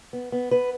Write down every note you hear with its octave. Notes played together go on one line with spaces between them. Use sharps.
B3
B3
B3 B4